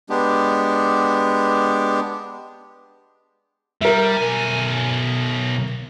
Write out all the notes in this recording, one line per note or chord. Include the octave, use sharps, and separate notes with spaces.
G#3 B3 D4 G4
G3 A#4 E5
B1 G#5